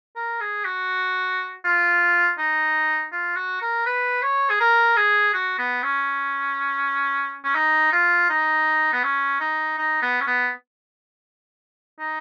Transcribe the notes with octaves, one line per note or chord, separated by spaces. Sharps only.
A#4
G#4
F#4
F4
D#4
F4
F#4
A#4
B4
C#5
G#4
A#4
G#4
F#4
B3
C#4
C#4
D#4
F4
D#4
B3
C#4
D#4
D#4
B3
C#4
B3
D#4